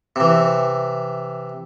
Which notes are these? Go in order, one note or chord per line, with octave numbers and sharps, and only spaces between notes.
C3 E3